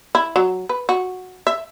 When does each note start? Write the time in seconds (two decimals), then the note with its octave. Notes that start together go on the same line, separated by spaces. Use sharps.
0.15 E4
0.36 F#3
0.69 B4
0.89 F#4
1.47 E5